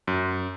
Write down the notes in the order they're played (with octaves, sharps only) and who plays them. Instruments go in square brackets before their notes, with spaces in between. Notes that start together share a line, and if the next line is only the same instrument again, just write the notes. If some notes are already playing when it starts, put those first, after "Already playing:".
[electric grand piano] F#2